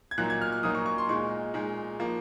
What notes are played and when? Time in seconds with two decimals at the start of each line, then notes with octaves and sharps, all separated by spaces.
0.11 G#6
0.18 A#2 F#3 A#3 D#4 F#6
0.30 G#6
0.42 F6
0.52 F6
0.63 A#2 F#3 A#3 D#4 D#6
0.75 C#6
0.86 C#6
0.98 C6
1.09 A#2 G#3 D#4 C#6
1.54 A#2 G#3 D#4
2.00 F3 A#3